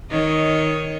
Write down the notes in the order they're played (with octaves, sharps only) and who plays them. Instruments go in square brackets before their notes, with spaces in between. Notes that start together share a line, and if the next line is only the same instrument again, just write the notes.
[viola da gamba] D#3 C#5 D#5